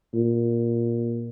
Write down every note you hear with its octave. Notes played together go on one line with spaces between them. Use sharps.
A#2